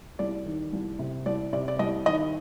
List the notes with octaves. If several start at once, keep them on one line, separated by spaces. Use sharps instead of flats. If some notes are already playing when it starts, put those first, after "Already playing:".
C2 D5
D#3
C2
C3
C2 D5
C3 D5
D5
C2 D#5
D#3 D#5